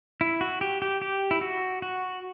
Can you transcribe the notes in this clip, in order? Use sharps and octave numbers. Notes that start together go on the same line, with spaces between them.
E4
F#4
G4
G4
G4
E4
F#4
F#4